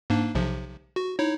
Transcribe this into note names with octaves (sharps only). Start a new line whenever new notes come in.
G#2 A#3 D4
B1 C3 F3
F#4
D#4 E4 C#5